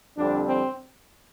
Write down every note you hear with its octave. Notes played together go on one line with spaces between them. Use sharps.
F2 D3 G3 C4 D4
C4